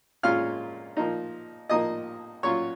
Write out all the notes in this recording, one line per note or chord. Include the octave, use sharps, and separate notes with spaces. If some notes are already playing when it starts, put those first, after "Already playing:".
A#2 G#3 C#4 F4 F5 F6
A#2 F3 A#3 D#4
A#2 F3 A#3 D#4 D#5 D#6
A#2 F#3 C#4 F4 C#5 C#6